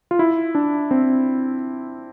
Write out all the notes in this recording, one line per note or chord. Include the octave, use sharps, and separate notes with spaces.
F4
E4
D4
C4